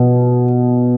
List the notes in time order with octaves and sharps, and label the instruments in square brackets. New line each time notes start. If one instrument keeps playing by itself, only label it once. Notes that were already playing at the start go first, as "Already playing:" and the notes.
Already playing: [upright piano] B2